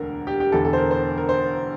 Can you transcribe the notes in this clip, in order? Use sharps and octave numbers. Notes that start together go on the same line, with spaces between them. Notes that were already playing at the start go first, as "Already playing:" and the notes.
Already playing: E1 D2 D3 A#4
G4
G4
E1 E2 D3 A4
A4
C5
A#4
C5
A#4
C5